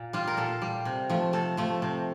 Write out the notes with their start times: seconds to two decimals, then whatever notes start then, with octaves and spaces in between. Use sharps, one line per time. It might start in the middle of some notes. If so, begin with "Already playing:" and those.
Already playing: A#2
0.13 G3 F4
0.27 A#4
0.37 A#2 A4
0.62 G3
0.85 C3
1.10 F3 A3
1.33 C3 A4
1.57 F3 A3
1.82 C3